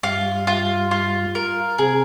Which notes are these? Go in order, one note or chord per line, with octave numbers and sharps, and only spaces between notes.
G2 G3 F4
F4
F4
A#4
C3 C4 G#4